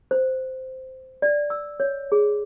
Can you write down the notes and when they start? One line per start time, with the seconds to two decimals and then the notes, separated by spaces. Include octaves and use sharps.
0.11 C5
1.22 D5
1.50 E6
1.80 C#5
2.12 G#4